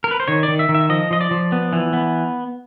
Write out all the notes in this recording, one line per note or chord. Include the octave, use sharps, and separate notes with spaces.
A#4
B4
C5
D#3 C#5
D5
D#3
E5
D#3
E5
F3 D#5
F3 D#5
D5
F3
B3
E3
B3